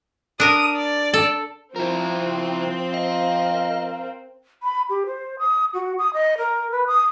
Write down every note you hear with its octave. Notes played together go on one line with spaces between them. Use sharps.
D4 A#4 D#6
D5
A4
F3 C4 E4 A#4
A#4 D#5 F5
B5
G4
C5
D#6
F#4
D#6
D#5
A#4
B4
D#6